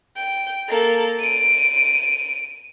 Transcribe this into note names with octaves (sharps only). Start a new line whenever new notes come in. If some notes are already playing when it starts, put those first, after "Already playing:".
G5
A#3 A4
D7 D#7